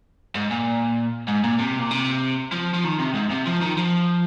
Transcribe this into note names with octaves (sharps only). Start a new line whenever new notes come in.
G#2
A#2
G#2
A#2
C3
A#2
C3
F3
F3
D#3
C3
G#2
C3
F3
D#3
F3